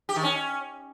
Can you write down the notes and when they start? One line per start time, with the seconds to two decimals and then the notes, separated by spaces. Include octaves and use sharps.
0.09 G4
0.16 D#3
0.23 C#4